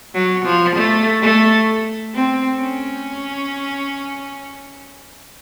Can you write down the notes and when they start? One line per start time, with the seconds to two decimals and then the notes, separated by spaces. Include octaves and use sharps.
0.15 F#3
0.45 F3
0.76 A3
1.22 A3
2.14 C4
2.60 C#4